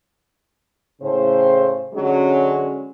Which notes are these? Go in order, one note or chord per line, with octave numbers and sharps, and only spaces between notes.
A2 C#3 C5
D3 F#3 G#3 C#4